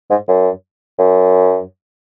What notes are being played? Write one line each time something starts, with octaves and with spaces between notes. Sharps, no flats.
G#2
F#2
F#2